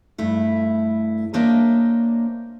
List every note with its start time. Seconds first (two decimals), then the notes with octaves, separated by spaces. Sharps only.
0.18 G2 A3 E4
1.33 A#3 D4 C5 C#5 D#5 E5